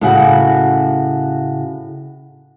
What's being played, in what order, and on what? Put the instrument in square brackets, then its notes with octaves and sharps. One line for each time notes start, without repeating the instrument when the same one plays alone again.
[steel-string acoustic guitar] A2 C#3 F#4